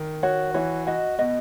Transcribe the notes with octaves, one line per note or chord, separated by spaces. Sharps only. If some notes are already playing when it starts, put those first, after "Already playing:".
Already playing: D#3
F#4 C#5
E3 C#5
F#4 D#5
B2 D#5